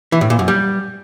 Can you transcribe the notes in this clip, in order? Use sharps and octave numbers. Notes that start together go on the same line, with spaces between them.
E3
A2
A#2
F#2
G3